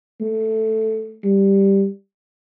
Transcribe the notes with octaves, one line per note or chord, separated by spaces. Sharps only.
A3
G3